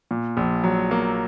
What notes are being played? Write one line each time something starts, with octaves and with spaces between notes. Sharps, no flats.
A#2
A#1
F#3
A#3